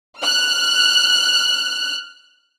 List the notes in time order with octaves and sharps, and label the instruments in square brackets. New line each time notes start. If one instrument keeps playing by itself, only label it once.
[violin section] F6 F#6